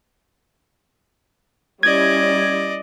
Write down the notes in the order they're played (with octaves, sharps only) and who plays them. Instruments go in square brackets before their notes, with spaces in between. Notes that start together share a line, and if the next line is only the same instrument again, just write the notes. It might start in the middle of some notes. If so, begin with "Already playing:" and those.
[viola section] G3 C#4 E4 [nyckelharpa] D5 D#5 [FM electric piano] G#6